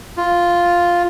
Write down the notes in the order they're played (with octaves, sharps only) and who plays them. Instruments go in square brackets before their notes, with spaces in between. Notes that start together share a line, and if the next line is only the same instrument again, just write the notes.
[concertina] F4